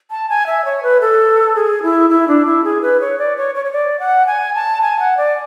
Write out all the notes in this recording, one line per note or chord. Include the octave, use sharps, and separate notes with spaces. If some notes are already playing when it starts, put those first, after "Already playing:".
A5
G#5
E5
C#5
B4
A4
G#4
E4
E4
D4
E4
G#4
B4
C#5
D5
C#5
C#5
C#5
D5
F#5
G#5
A5
G#5
F#5
D5